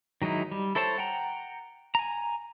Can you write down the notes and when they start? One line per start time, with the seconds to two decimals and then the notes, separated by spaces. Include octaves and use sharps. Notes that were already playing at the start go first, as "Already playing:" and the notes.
0.22 D#3 F#3 G#3 D#4 E4
0.52 G3
0.75 E4 A4 C5 C#5 A5
0.98 F#5 G5 A#5
1.95 G#5 A#5